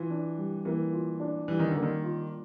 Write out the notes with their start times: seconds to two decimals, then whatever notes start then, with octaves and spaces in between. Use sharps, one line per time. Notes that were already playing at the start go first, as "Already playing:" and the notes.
Already playing: E3 F4
0.10 D4
0.38 G3
0.65 E3 A#3
0.93 F4
1.20 D4
1.48 E3 G3
1.59 D#3
1.71 D3 A#3
1.83 D#3
2.03 F4